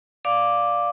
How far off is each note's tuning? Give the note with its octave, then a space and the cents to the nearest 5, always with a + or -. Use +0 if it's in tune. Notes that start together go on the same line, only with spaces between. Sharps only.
D5 +0 F5 +5 D6 +0